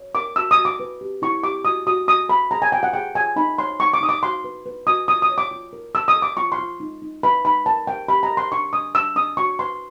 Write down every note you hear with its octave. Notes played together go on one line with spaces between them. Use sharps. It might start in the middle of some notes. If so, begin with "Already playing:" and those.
Already playing: C#5
A#4 D6
F#4 E6
D#6
F#4
D6
B4
G4
E4 C#6
G4 D6
F#4 D#6
F#4 D#6
F#4 D#6
A4 B5
G#4 A#5
G#5
F4 G5
F#5
G#4 G5
F4 G#5
D#4 B5
C#5 C6
D#4 C#6
D6
D#4 D#6
D6
F#4 C6
B4
B4
F#4 D#6
F4 D#6
D#6
C#5
D6
F4
A#4
A4 E6
D#6
A4
D6
F4 C#6
C6
F4
D#4
D#4
B4 B5
D#4 B5
A#4 A5
A#4 G5
G4 B5
A#5
A#4
C6
D4 C#6
D4 D#6
D4 E6
D4 D#6
F#4 C#6
B4 C6